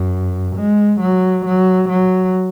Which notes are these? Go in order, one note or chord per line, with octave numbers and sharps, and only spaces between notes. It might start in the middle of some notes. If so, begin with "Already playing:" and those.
Already playing: F#2
G#3
F#3
F#3
F#3